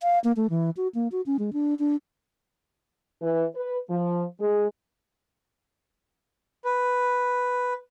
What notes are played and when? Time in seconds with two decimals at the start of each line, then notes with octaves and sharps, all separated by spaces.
0.03 F5
0.24 A#3
0.37 A3
0.50 E3
0.77 F#4
0.95 A#3
1.12 F#4
1.26 C#4
1.39 G#3
1.53 D4
1.79 D4
3.22 E3
3.55 B4
3.90 F3
4.40 G#3
6.65 B4